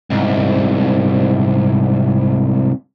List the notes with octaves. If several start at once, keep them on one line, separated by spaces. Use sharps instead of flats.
C2 G#2